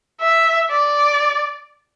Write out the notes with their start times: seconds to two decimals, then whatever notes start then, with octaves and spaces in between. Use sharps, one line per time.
0.21 E5
0.71 D5